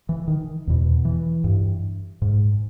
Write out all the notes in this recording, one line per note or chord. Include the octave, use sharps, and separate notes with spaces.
E3
D#3
E2 B2
E3
G2
G#2